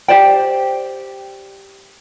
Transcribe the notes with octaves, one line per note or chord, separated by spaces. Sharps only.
G4 C5 D5 G5